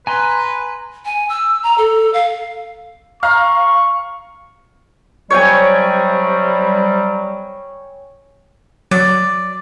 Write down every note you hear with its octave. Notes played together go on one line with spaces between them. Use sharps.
B4 G#5 A#5 C6
G#5
E6
A#5
A4
F5
F5 A#5 C#6 F6
C3 F#3 G3 C#5 G5 G#5
F#3 D5